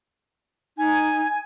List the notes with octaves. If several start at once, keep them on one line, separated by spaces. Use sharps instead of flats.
D#4 G#5